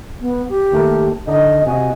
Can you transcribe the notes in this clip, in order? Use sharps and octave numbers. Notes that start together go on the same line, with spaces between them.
B3
G4
D#2 A3 A#4
D3 D4 D#4 D#5
C3 F#4 D#5 G#5